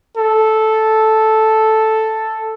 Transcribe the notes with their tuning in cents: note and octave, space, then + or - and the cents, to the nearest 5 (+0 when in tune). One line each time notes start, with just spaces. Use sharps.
A4 -5